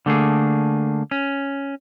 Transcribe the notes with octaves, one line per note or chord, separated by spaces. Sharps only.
D3 A3 A#3 G#4
C#4